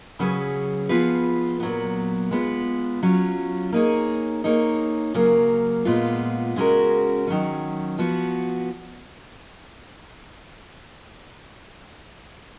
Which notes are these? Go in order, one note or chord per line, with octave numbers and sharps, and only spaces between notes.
C#3 F#3 C#4 G#4 B4
F3 B3 F4 G#4 B4
A#2 F#3 B3
G#3 B3 F4
F#3 C#4 F4
A#3 D#4 G#4 C#5
A#3 D#4 G#4 C#5
C#3 F#3 A#3
A#2 G#3 B3 F4
C#3 G#3 C#4 F#4 A#4
D#3 F#3 C#4
F3 B3 F#4